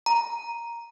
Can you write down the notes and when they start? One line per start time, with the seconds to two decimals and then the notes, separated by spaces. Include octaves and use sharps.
0.06 A#5